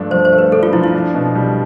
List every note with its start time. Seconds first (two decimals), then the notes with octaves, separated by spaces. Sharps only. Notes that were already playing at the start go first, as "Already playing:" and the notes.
Already playing: G2 F3 A3 D4
0.10 F3 C5
0.25 C5
0.32 A3
0.38 B4
0.52 D4 A4
0.63 F4
0.73 F3 E4
0.84 E4
0.94 D4
1.14 B2
1.35 G3